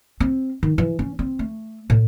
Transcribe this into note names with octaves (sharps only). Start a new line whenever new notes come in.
C4
D#3
E3
C#4
C4
A3
A2